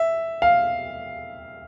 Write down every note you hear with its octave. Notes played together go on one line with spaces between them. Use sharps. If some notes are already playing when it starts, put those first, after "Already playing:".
Already playing: E5
F5